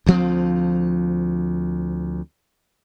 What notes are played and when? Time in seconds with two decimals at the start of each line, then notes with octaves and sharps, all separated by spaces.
0.06 D2 F3 C4